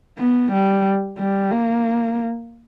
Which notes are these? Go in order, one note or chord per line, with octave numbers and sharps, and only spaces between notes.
B3
G3
G3
A#3